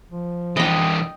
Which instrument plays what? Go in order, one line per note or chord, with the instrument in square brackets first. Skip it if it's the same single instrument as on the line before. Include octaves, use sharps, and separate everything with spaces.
[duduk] F3
[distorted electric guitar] E3 D4 [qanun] D#5 G5